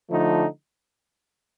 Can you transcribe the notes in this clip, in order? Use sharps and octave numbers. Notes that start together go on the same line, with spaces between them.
D3 F3 A3 D#4